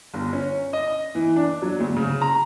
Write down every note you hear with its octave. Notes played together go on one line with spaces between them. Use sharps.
G1
C#4
D#5
E3
D4
F#3
D2
C#3
A#5